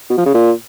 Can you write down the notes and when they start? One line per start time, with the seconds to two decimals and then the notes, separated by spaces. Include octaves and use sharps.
0.10 B2
0.18 F3
0.26 C#3
0.34 A#2